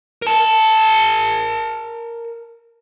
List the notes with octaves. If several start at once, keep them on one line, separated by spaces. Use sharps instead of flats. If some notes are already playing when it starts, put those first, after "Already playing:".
A#4 A5